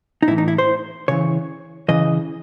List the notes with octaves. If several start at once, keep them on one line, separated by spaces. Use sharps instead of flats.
D#4
A2 E3 E4
D#4
E4
C5
C#3 E3 C#5
C#3 E3 D#5